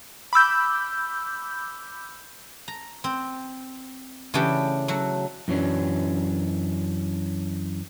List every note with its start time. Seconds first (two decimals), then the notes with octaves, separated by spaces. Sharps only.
0.33 B5 D6 E6 G6
2.68 A#5
3.04 C4
4.34 C#3 E3 A3 C#4 D4 G4
4.88 F#3 A3 F#4
5.48 F#2 E3 F#3 C#4 D4